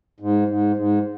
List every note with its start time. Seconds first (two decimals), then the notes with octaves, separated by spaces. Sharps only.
0.20 G#2
0.48 G#2
0.76 G#2